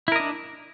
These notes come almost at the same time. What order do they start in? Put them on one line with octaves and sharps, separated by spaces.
E4 A#4 D#5 D4